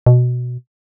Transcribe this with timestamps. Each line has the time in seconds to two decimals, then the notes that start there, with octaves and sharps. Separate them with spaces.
0.06 B2